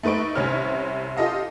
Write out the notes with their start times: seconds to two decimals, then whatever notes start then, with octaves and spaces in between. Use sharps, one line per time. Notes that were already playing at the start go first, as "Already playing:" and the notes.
0.03 A3 D#4 B4 C#6 D7
0.35 C2 C3 C4 C#4 C#5 F6
1.17 F4 G4 A4 D#5 F5